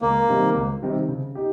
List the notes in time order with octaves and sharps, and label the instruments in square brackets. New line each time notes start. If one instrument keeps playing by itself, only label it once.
[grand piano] C#2 [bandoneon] A#3
[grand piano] C3 D#3 G3 C4
C#2
C3 D#3 G3 C4
C#3
D#4 G4